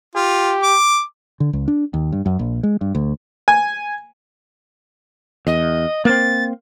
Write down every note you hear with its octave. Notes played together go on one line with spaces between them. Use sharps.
F4 G4
D6
D3
C#2
D4
D#2
G2
F#2
A#1
G#3
G2
D2
G#5
E2 D#5
A#3 C4 A6